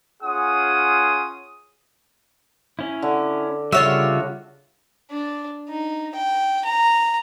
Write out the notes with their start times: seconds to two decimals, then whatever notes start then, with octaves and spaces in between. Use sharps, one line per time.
0.23 C#4 F4 G#4 F#5 C6 D#6
2.79 C#4 E4
3.02 D3
3.72 C#3 G3 F4 F#4 C#5 E5
5.11 D4
5.69 D#4
6.15 G5
6.65 A#5